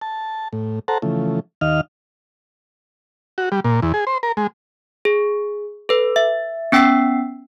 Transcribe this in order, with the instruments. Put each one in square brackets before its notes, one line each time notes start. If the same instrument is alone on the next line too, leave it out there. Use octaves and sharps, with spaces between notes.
[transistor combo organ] A5
A2
A4 C5 F#5 A5 A#5
C#3 E3 F3 A3
D#2 D#3 D#5 F5 F6
F#4
G3
A#2
E2
G#4
C5
A#4
G#3
[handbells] G#4
A4 B4
E5
B3 C#4 G5 E6 B6 C7